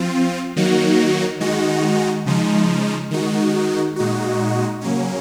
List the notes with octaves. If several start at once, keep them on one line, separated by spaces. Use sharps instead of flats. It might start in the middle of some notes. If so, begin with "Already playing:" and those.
Already playing: F3 C4 F4
D#3 F#3 A#3 D#4 F#4
D#3 G#3 D#4 F#4
C#3 F3 G#3 D#4
D#3 G#3 D#4 F#4
A#2 G#3 D#4 F#4
C#3 F#3 A#3 C#4